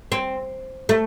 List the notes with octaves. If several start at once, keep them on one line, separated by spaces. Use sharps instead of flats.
C4
A3